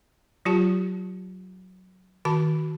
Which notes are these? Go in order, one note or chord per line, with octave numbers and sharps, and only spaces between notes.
F#3 F4 G4 A5
D#3 F#4 A5